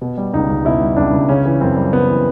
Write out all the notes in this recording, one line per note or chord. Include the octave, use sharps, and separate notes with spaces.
B2
G3
C#2 D#4
C#2
B2 E4
G3
C#2 D4
C#2
C#3 C#4
E3
F#2 C4
G3
C#3 B3
E3